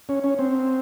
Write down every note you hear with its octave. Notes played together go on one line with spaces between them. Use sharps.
C#4
C#4
C4